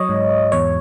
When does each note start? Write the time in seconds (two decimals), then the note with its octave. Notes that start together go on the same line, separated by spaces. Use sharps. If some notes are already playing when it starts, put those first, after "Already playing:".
Already playing: F#3 C#5 D#5
0.09 G#2
0.52 E2 C#5